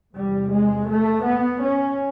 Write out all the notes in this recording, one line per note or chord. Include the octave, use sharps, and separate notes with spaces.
E2 C3 G3
G#3
A3
B3
C#4